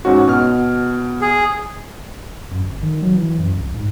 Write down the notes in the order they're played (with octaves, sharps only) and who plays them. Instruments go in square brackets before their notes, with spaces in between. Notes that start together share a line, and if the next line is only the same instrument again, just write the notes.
[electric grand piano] G#2 C#4 F#4
B2 F6
[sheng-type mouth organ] G#4
[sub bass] F#2
G1
D#3
F#3
E3
F#2
C2
G#2